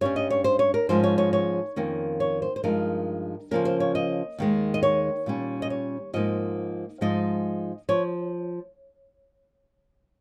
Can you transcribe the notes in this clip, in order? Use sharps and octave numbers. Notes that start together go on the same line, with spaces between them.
G2 G3 C#4 C#5
D#5
C#5
C5
C#5
A#4
G#2 F3 G#3 C#4 C5
C#5
C#5
C#5
F2 D#3 A#3 C#4
C#5
C5
C5
G2 F3 G#3 D#4 A#4
C#3 F3 A#3 C#4 A#4
C5
C#5
D#5
D#2 D#3 G#3
D#5
C#5
A#2 G3 C#4
D#5
C#5
G#2 F3 A#3 D#4 D#5
G#2 F3 G#3 D#4 D#5
F3 C#5